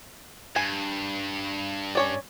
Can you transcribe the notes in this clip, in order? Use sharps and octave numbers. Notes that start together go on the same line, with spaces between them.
G2 G#5
C#4 C#5 D5